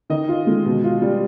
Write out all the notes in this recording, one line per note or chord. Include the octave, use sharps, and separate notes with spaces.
D#3 D#5
F4
G#3
B2
F4
G3